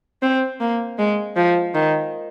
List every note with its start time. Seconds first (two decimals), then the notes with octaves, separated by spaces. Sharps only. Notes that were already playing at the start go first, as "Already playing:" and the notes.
0.22 C4
0.61 A#3
0.98 G#3
1.36 F3
1.74 D#3